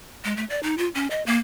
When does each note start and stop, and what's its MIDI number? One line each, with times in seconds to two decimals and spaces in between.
0.25 0.36 56
0.37 0.45 57
0.50 0.60 74
0.63 0.77 63
0.78 0.88 65
0.95 1.07 61
1.10 1.23 75
1.26 1.38 58